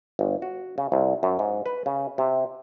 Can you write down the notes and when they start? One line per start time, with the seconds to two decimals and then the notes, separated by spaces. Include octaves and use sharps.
0.19 G1
0.42 F#4
0.78 C#3
0.92 C2
1.23 F#2
1.39 G#2
1.66 B4
1.86 C#3
2.18 C3